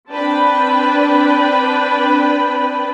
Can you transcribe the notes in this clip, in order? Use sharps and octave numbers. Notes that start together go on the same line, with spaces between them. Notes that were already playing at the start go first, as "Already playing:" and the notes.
C4 D4 B4 G5 A5 B5